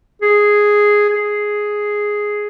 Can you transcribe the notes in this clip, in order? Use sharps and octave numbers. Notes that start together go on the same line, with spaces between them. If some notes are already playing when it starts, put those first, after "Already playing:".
G#4
G#4